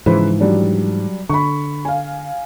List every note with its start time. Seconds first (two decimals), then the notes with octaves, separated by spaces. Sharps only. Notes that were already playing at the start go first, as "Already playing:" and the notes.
0.06 G#2 C#3 E3 F3 B4 C5
0.40 F#3 G3 D4
1.30 D3 B5 C#6
1.85 F5 G#5